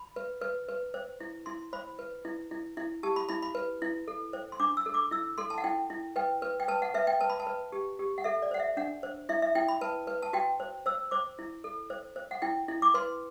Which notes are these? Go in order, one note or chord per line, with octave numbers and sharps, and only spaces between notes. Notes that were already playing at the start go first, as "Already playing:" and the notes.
Already playing: B5
B4
B4
B4
C5
E4
E4 C6
C5 B5
B4
E4
E4
E4
G4 A5
B5
E4 B5
B5
B4
E4
A4
C5
C6
D4 D6
E6
A4
D6
E4 E6
A4 C6
A5
F#5
E4 G5
E4
B4 G5
B4
G5
B4 A5
F#5
B4 E5
G5
B4 A5
B5
A5
B4
G4
G4
F#5
A4 E5
D5
C5 F#5
E5
D4 F#5
C5
E4 E5
E5
E4 G5
B5
B4 A5
B4
A5
F#4 G5
C5
C5 E6
C5 D6
E4
A4
C5
C5
F#5
E4 G5
E4
D6
B4 C6